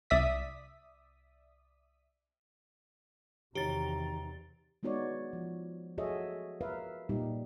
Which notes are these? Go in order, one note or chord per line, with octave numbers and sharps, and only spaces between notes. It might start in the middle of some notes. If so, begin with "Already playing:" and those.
C2 D5 E5 D#6 B6
E2 C3 D#3 F#4 G4 C#5 A#5 A6
G#3 B3 D#4 F#4 C#5 D5
F3
F#4 G#4 A4 C#5 D#5 E5
A#4 B4 E5 F5
A#2 G3 D#4 G4